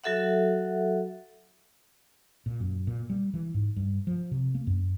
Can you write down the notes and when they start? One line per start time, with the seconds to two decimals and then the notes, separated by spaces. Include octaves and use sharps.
0.04 F#3 F#4 A4 E5 F#5
2.46 A#2
2.60 F#2
2.87 A#2
3.10 G3
3.34 E3
3.54 G#2
3.76 G2
4.07 F3
4.31 C3
4.55 A#3
4.67 F#2